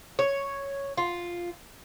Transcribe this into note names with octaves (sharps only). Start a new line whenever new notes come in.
C#5
F4